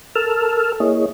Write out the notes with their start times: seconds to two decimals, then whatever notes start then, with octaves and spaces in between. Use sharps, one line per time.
0.15 A4 A#4 A5 E6 F6
0.80 A#3 E4 G#4 C#5 D#5